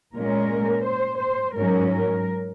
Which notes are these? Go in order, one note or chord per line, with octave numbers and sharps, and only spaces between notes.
A#2 G#3 C#4 A#4
C5
C5
G#2 F#3 C#4 A#4
A#4